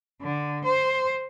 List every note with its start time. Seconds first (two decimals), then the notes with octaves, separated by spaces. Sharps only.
0.22 D3
0.65 C5